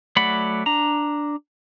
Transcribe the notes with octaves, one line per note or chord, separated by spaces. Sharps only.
F#3 A3 D5 F#5 B5
D4 A#5